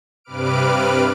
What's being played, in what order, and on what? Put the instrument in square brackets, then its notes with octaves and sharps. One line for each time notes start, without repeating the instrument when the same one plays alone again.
[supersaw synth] G2 C3 B4 D6 F6 D7